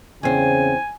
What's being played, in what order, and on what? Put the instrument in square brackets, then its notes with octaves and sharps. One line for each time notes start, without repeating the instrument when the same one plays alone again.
[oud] E2 C4 [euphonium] C#3 [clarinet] G#5